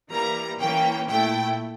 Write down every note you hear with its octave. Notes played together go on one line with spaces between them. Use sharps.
E3 G3 A#3 A#5
E3 A#3 C#4 G5
A#2 A3 E4 G5